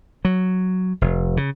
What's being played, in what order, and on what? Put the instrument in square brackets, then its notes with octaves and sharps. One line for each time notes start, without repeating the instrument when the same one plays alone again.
[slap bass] F#3
F1
C#3